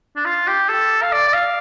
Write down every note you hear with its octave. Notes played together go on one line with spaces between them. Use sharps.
D4
F4
G4
A4
F5
D5
D5
F5